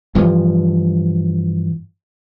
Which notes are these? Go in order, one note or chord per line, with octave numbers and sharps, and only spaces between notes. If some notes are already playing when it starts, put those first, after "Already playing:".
G2 E3 F3